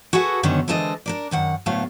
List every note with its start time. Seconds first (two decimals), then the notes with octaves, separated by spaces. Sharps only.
0.13 F#4 G#4 A4 B4 F#5
0.43 F#2 D3 D#3 B3 C#4
0.68 E3 G#3 D4 A4 C5 D#5
1.06 D4 A#4 D5
1.31 F#2 D#3 F#5
1.66 D2 A2 F#3 A3 B3 F5